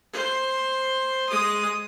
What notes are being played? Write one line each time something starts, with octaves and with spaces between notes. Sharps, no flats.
C5
G#3 D#6